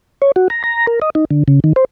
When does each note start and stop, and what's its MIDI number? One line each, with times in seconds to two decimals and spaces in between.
0.22 0.32 73
0.36 0.48 66
0.50 0.63 82
0.64 0.86 82
0.87 0.99 70
1.02 1.10 75
1.15 1.25 63
1.31 1.44 50
1.48 1.60 49
1.64 1.73 51
1.76 1.85 72